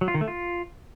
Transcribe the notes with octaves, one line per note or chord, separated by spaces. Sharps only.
F#3
F4
D#3
A3
F4